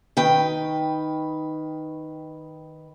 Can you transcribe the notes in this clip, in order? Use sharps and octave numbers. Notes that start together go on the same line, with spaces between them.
D#3 B4 G5